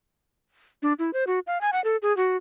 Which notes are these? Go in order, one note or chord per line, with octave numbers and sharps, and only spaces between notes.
D4
E4
C5
F#4
F5
G#5
F#5
A4
G#4
F#4